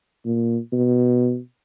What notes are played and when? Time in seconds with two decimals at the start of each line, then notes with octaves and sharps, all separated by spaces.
0.25 A#2
0.73 B2